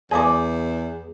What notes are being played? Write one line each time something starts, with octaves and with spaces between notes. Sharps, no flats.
E2 G#4 D5 F5 D6